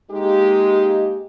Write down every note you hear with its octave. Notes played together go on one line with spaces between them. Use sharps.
G#3 A#3 D#4 G4